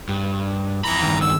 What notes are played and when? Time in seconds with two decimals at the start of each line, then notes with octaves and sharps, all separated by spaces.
0.09 G2
0.84 F2 E3 A#5 B5
1.02 G2 D#3
1.21 E6